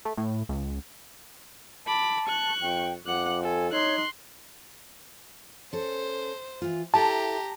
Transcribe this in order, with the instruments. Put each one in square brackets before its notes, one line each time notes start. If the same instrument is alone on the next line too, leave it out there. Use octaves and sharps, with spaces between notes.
[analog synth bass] A3
A2
C#2
[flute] A5 [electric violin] B5 D6
[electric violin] C#6 F#6
[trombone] F2 [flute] G5
[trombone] F2 [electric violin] F#5 F#6 [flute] D6
[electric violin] A4 [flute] G#5
[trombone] D#4 [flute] C#5 [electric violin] C6 F#6
[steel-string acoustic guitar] C#4 A4 [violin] C5
[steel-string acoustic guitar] E3 F4
[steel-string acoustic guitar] E4 A4 [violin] G4 A#5 [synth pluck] A5